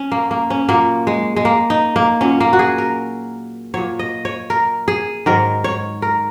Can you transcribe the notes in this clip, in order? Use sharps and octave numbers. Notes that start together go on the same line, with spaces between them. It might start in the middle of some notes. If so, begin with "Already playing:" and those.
Already playing: C#4
A#3
A#3
C#4
A#2 F#3 A#3
G#3
G#3
A#3
D#4
A#3
A#2 F#3 C#4
A#3
F#4
G#4
A#4
A#2 F#3 C#5
D#5
C#5
A#4
G#4
G#2 D#3 F#3 A#4
C#5
A#4